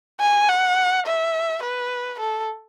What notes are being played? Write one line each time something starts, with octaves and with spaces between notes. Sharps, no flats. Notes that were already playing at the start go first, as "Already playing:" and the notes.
G#5
F#5
E5
B4
A4